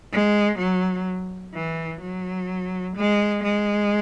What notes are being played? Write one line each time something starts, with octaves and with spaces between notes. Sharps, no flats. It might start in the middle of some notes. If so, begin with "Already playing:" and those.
G#3
F#3
E3
F#3
G#3
G#3